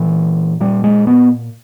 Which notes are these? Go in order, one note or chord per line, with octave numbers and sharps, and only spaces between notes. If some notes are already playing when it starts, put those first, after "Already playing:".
Already playing: A#2 E3
A#2 G3
G#3
B3